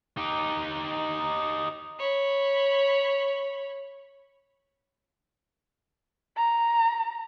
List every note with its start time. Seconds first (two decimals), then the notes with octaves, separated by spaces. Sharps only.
0.17 D#4 G4
1.99 C#5 B5
6.37 A#5